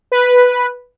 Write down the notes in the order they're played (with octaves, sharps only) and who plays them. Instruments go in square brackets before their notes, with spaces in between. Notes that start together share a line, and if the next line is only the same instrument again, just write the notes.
[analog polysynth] B4